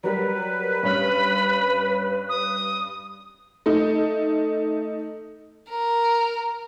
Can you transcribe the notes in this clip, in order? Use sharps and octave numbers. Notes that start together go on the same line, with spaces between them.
F#3 G3 A#4 B4
G2 C#4 B5 F6
D#6
A3 D#4
A#4